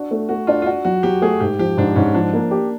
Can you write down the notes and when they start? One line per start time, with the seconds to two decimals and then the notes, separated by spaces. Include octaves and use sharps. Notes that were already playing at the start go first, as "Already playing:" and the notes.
Already playing: D4 F#4
0.11 A3
0.29 A3 F#4
0.47 D4 F4
0.62 F4
0.66 D4 F#4
0.85 F#3 F#4
1.03 F#3 G4
1.22 A3 G#4
1.40 G#2 G4
1.59 F3 G4
1.77 G#2 D4
1.96 G#2 C#4
2.14 F3 D4
2.33 A#3
2.51 G4